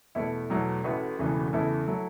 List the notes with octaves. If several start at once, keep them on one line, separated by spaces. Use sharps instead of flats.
E2 B2 A3 E4
E2 B2 F#3 A3
A1 A2 A3 F#4 B4
E1 E2 C#3 E3 A3
E2 C#3 E3 A3 E4 A4
F#3 A3